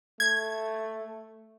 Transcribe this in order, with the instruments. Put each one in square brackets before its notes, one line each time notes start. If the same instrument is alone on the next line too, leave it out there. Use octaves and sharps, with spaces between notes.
[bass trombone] A3 [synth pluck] G#6